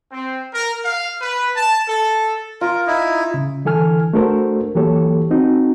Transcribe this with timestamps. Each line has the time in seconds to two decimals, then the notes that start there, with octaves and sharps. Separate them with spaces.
0.12 C4
0.53 A#4
0.84 F5
1.21 B4
1.56 A5
1.88 A4
2.61 F4 A#4
2.87 D#4 E4
3.34 C#3
3.65 D3 E3 A4 G#5 F6
4.14 A3 D4 F#4 A4 A#4 C5
4.75 E3 F#3 A#3 G4 A4 C#5
5.31 C4 D#4 F#4